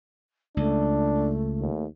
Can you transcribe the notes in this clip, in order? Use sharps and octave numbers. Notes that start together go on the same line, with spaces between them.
C#2 A3 D4
D#2